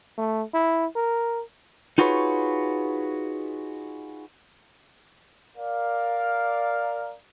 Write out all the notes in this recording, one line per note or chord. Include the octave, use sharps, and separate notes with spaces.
A3
E4
A#4
D#4 F4 F#4 G#4 B4 C#5
A#4 D5 F5